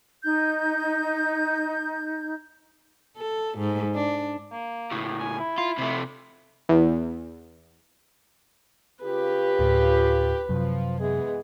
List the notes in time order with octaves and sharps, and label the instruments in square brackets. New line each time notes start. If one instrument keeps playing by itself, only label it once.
[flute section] D#4 G6
[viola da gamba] A4
G#2
D4
[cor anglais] A#3
[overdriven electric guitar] C#2 A2
[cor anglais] G#5
E4
[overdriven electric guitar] F4
C3 A3
[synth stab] E2
[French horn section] C#3 F4 G4 [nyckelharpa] B4
[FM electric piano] D2 A2
[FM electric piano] F#2 C3 F#3 [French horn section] F3
[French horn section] E3 G#3 B3 [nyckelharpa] G#4